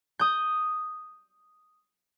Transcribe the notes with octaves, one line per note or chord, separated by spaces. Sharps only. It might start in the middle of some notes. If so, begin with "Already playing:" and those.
D#6 G6